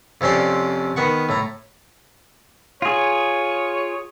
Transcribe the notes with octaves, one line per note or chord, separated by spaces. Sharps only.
F2 C3 C#4 D5 C6
D#3 B3 F#5 C#6
A2 A#5
F4 G#4 C#5